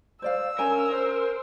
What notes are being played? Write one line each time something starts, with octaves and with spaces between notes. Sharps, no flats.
C5 D5 F5 E6
C#4 A#4 G#5
C5